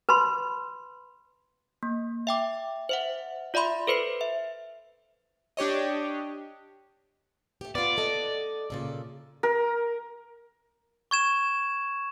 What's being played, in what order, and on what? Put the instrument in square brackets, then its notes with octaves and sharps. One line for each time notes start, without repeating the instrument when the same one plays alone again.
[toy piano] B4 A5 B5 C6
[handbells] A#3
E5 G5 D6
C5 E5 F#5
F4 D5 E5 B5 C6
A4 B4 C5 C7
E5
[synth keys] D4 G4 C#5 D#5
[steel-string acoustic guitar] A3 G4
[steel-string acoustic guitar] B3 F4 [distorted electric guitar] D5
[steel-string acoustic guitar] A4 D#5 F#5
A#2 C#3 A4
[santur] A#4
[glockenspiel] C#6 G#6 E7